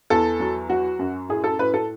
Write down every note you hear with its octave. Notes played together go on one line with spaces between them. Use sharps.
E2 A4
F#3
F#3 F#4
F#2
A2 G#4
A4
A2 B4
A4